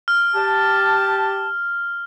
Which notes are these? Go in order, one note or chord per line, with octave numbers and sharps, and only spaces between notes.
F6
G4 A5